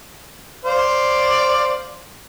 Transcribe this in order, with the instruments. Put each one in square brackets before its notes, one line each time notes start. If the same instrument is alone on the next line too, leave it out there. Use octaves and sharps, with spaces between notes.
[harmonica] C5 D5 F5